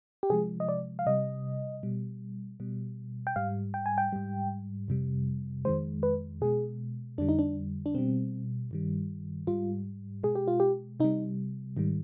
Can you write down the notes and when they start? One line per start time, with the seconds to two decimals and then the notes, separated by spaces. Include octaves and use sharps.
0.23 G4
0.30 C3 F3 G#3 G#4
0.60 D#5
0.69 D5
0.99 F5
1.06 C3 G3 D#5
1.83 B2 G3
2.60 B2 G3
3.27 G5
3.36 G#2 G3 F5
3.74 G5
3.86 G#5
3.98 G5
4.12 G#2 G3
4.88 F2 C3 G3
5.65 F2 D#3 G#3 C5
6.03 B4
6.41 B2 G#3 G#4
7.18 F2 D3 G3 D4
7.29 D#4
7.39 D4
7.86 D4
7.95 B2 G3 C4
8.71 G2 D#3 G3
9.47 G#2 G3 F4
10.23 B2 G#3 G#4
10.35 G4
10.48 F4
10.60 G4
11.00 C3 G3 D#4
11.77 G#2 D#3 G3